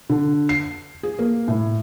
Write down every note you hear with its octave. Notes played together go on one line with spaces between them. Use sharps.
D3
C7
G#4
A#3
A2